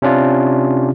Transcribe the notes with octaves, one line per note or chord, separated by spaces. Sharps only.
C3 C#4 D4 F4